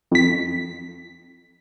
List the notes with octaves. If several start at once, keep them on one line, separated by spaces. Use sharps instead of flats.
F2 B6